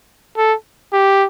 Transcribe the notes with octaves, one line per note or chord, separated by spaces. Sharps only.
A4
G4